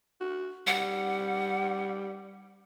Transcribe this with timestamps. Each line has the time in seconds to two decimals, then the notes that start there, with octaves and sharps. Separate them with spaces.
0.20 F#4
0.67 G3 F#5